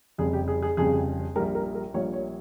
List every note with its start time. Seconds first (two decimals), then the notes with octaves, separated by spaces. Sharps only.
0.18 F1 F2 C#3 G3 G#4
0.33 G4
0.48 G#4
0.62 G#4
0.77 F1 F2 C#3 G3 G#4
1.36 A#1 A#2 G3 A#4
1.55 A#4
1.75 A#4
1.94 A#1 A#2 G3 C#5
2.13 C#5